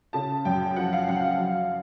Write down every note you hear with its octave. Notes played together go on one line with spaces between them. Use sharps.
C#3 A5
F#2 G5
F3 F#5
F5
F#2 F#5
F5
F#3